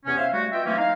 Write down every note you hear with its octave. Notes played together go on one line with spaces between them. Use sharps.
E2 C3 B3 C#4
C#4 C5 E5 F5
G3 A3 F#4
B3 F4 D#5 E5 G5
E3 F#3 A3 A#3 C4 C#4
D#4 F5